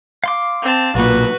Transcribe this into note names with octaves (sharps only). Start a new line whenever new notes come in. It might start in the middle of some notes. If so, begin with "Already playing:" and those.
F5 C6 D6
C4 A5
B1 A#2 F#4 B4